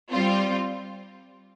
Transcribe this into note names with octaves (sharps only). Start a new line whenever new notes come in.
G3 C4 F4